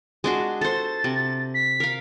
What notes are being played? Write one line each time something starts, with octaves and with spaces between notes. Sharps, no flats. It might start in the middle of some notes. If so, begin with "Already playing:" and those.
G#3 D4 F#4
A4 C5 A6
C3
B6
A#4 F5